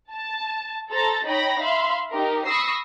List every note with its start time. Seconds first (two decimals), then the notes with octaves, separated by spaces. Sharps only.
0.11 A5
0.90 A4 C5 A#5 A6
1.26 D#4 C#5 G5 B5 A#6
1.61 E5 F5 B5 C6
2.11 D#4 G4 A#4
2.45 B5 C#6 D#6 E6 A#6 C7